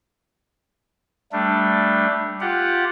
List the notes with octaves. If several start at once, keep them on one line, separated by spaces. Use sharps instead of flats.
G3 A3 D4
F4 G4 F#5